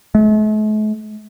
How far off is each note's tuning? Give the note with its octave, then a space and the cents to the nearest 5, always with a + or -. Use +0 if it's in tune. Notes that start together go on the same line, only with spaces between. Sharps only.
A3 -45